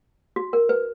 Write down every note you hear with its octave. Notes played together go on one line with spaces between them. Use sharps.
F#4
A#4
B4